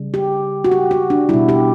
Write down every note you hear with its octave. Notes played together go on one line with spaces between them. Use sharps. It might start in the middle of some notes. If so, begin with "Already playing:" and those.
Already playing: C#3 G3
G4
F#4
G4
F#4
D4
B2 G3 E4
G4